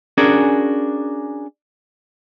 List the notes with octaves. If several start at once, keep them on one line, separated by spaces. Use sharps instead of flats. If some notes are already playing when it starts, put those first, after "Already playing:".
C#4 D4 F#4 G#4 A#4